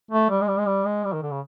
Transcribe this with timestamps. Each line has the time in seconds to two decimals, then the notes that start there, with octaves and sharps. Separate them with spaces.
0.11 A3
0.29 G3
0.41 G#3
0.47 G3
0.58 G#3
0.66 G3
0.85 G#3
1.04 G3
1.12 D#3
1.22 D3
1.31 C#3